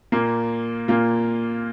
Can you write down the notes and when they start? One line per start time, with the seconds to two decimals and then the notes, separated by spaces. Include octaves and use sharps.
0.12 A#2 A#3 F4
0.88 A#2 A#3 F4